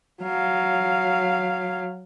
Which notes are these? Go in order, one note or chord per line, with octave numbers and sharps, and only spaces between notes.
F#3 F5